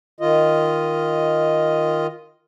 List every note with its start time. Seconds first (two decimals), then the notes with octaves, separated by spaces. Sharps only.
0.20 D#3 F4 D#5